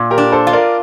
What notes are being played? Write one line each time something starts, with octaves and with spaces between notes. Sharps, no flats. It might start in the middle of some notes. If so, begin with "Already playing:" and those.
Already playing: A#2
G4 A#4
D4
A4 C5
F4
A#4 D5